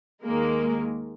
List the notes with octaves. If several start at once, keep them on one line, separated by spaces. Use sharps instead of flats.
D#2 D#3 G#3 A#3 A#4